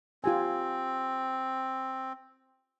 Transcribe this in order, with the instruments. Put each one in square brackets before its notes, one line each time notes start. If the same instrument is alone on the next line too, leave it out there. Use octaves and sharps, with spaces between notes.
[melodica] C4 [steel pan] F4 G4 G#5